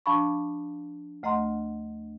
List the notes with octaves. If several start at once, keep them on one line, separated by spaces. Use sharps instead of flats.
F3 D4 F5 A5 B5 C#6
D2 A3 D#5 F#5 A#5 C6